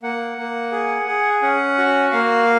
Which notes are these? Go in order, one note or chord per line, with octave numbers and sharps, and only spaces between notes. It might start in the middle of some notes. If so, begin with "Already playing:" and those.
A#3 F#5
A#3
G#4
G#4
C#4 F#5
F#4
A#3 F5